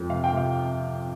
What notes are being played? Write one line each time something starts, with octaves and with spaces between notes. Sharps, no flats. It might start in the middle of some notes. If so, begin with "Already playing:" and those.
Already playing: F2
C3 F5
G5
C3 F5